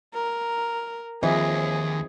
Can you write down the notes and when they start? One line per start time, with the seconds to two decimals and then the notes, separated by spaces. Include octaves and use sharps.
0.14 A#4
1.23 D#2 E3 F3 C4 G#4 D#5